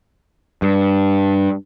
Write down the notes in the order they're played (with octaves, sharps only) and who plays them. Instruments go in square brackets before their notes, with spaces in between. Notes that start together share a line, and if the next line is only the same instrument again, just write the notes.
[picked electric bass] G2